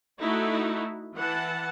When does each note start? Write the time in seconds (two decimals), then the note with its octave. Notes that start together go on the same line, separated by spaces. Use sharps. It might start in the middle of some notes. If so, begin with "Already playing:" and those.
0.20 A3 D#4 E4 F#4
1.15 E3 F#5 A5